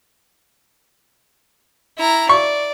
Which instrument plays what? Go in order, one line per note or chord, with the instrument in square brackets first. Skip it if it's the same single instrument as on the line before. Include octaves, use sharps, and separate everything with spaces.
[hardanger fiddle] E4 A#5
[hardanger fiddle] D5 [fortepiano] C#6